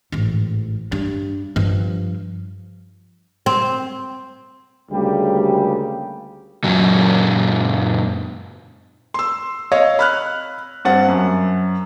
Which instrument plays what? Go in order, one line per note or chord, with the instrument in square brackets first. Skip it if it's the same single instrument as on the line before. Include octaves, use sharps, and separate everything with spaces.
[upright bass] A1 G#2
G2
G2 F3
[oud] C4
[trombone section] D2 C#3 G3 G#3 A#3 G4
[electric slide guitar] F#2 A#2 F#3
[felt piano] C6 E6
C#5 D#5 F5
B5 F6 F#6
G2 C4 F#5 A6
F#2